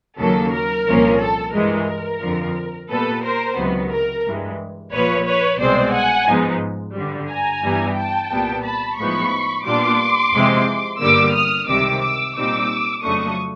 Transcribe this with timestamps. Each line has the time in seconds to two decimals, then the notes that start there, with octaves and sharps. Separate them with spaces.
0.19 D#2 C#3 F#3 A#3 A4
0.53 A#4
0.87 C2 A#2 F3 A#3 C#4
1.20 A4
1.54 G2 E3 G#3 A#4
2.22 F2 D3 F3
2.90 A#2 G3 B3 A4 B4
3.24 A#4 C5
3.57 C#2 C3 D#3 F#3 B3
3.91 A#4
4.24 G2 E3 G#3
4.92 A#1 A#2 F3 B4 C#5
5.26 B4 C#5
5.60 C2 B2 G#3 C4 C5 D5
5.93 F#5 G#5
6.27 G#2 F3 G#3 B3 D#4
6.95 G2 D3 G3
7.29 G#5 A#5
7.63 G2 E3 G3 B3 E4
7.97 G5 A5
8.31 C2 A#2 G3 B3
8.64 A5 B5
8.98 A2 F3 G#3 B3 D#4 B5 C#6
9.65 A#2 G3 B3 D4 F4 C6 D6
10.33 F2 C3 E3 G#3 C4
11.00 G1 G2 D3 G3 A#3 D6 E6
11.34 D#6 F6
11.68 C#2 C3 D#3 G3 D6 E6
12.02 D6 E6
12.36 A#2 G3 C4 D#4 D6 E6
13.03 F2 C#3 F#3 A3 D4 C#6 D#6